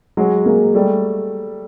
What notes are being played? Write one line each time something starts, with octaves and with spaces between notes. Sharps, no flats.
F#3 G#3
G#3 A#3
G3 A3